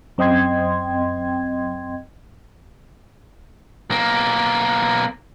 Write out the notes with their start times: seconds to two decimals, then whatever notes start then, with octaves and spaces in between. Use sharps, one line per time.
0.18 F#2 C4 D#5 G5 C6 G#6
3.90 B1 A#3